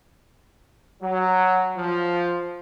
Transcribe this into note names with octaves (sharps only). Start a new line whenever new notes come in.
F#3
F3